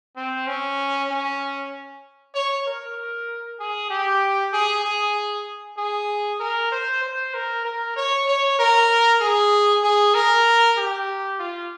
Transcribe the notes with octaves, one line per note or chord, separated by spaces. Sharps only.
C4
C#4
C#4
C#5
A#4
G#4
G4
G#4
G#4
G#4
A#4
C5
C5
A#4
A#4
C#5
C#5
A#4
G#4
G#4
A#4
G4
F4